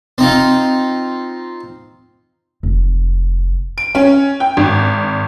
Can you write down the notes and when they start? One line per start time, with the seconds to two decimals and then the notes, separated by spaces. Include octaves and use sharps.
0.18 C4 D#4 F4
2.63 F1
3.78 D7
3.95 C#4
4.40 G5
4.57 G#1